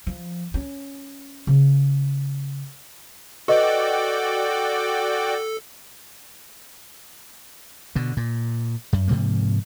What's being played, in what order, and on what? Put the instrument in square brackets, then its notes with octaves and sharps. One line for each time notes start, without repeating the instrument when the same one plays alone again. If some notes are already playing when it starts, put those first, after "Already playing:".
[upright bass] F3
C#4
C#3
[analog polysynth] F#4 D5 G5 [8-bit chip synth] A4 [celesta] B4 D#5 C#6
[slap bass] B2 D3
A#2
F#2
G#2 C3 F3 A#3